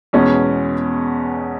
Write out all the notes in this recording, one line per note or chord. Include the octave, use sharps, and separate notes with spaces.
E2 B2 G#3 C#4